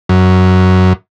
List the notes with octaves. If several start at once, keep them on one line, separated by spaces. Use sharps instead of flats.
F#2